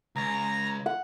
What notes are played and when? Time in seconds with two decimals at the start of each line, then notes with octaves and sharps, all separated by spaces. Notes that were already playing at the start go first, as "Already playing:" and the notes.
0.16 C#2 A#5
0.86 F#5